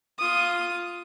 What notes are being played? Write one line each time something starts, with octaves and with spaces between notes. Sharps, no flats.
F4 D#6